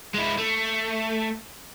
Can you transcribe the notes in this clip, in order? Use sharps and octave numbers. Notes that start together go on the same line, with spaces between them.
G#3 E4
A3